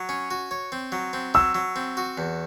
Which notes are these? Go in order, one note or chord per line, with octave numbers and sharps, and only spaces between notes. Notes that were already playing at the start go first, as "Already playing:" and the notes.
Already playing: F#3
C#4
F#4
C#5
C4
F#3
C4
F#3 E6
F#3
C4
F#4
E2